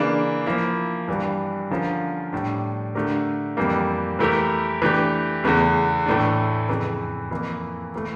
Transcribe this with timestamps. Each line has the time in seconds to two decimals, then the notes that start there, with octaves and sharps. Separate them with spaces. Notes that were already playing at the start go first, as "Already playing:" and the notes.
Already playing: C#3 E3 A#3 D4
0.46 F3 A#3 E4
1.08 G2 E3 G3
1.71 D3 F3 C#4 F4 A#4
2.33 A2 G3 D4
2.95 D3 A3 D4 G4 A#4
3.57 F2 E3 G3 A#3
4.19 E3 A3 E4 G4 A#4
4.82 E3 A3 D4 G4
5.44 E2 C#3 E3 A3
6.06 A2 E3 A3 D4
6.69 F2 C#3 E3
7.31 F2 E3 A#3
7.95 E3 A3